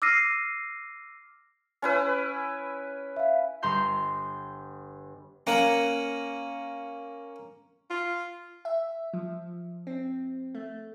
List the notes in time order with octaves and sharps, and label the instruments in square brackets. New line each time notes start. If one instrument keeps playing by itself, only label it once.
[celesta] D6 E6 F6 A#6 C7 D#7
[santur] C#4 E4 B4
[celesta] E5 F5
[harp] G1 A#5 C6 G6
[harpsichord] A#3 C#4 F#5
[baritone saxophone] F4
[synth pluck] E5
F3
C4
A3